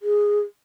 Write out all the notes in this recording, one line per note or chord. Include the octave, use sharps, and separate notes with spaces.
G#4